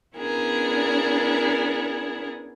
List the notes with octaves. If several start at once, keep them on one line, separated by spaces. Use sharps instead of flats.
B3 C#4 D4 E4 G#4 A#4